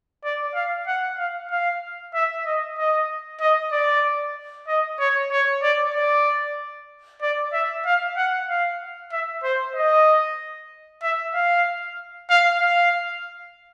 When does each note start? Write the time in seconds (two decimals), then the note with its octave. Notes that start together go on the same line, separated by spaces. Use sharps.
0.24 D5
0.55 F5
0.87 F#5
1.18 F5
1.51 F5
2.14 E5
2.46 D#5
2.78 D#5
3.40 D#5
3.72 D5
4.68 D#5
4.99 C#5
5.32 C#5
5.63 D5
5.94 D5
7.22 D5
7.53 E5
7.86 F5
8.17 F#5
8.49 F5
9.12 E5
9.43 C5
9.75 D#5
11.03 E5
11.34 F5
12.30 F5
12.61 F5